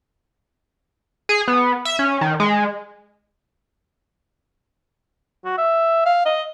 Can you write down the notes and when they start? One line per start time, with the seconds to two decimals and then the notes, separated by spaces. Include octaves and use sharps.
1.29 G#4
1.48 B3
1.85 E5
1.99 C#4
2.21 D#3
2.40 G#3
5.45 F#4
5.58 E5
6.06 F5
6.25 D#5